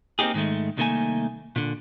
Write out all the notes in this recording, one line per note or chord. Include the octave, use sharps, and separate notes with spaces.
A#3 C4 C#4 D#4 G4 G#4
G#2 D#3 G#3 A3
C2 B2 D#3 A3 A#3 G#5
A#2 D3